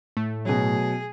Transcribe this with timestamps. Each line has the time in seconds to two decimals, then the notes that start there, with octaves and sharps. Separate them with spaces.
0.17 A2 A3
0.45 B2 F#3 G#4